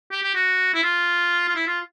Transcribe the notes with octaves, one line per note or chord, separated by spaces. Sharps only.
G4
G4
F#4
E4
F4
F4
E4
F4